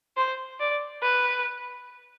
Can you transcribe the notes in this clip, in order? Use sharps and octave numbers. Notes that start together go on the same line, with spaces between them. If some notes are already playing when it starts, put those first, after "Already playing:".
C5
D5
B4